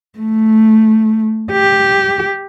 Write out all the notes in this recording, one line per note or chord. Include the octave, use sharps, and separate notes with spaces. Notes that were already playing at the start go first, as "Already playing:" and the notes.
A3
G4